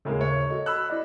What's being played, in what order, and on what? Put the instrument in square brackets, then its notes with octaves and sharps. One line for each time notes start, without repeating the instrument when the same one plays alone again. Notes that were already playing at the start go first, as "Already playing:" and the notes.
[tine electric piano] D#2 C#3 [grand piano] A2 G#3 A#3
[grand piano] C#5
[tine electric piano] F#4 A4 D#5
[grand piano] B5 E6 F#6
[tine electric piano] E4 D5 D#5